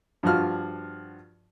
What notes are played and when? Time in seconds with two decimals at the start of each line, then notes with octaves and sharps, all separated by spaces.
0.23 G2 F3 F4 F#4 F6